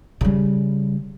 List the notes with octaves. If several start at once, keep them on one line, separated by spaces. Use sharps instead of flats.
C#3 G3